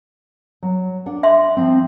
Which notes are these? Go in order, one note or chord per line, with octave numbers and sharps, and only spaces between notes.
F#3
D4 F#5
E5 C6
F3 C4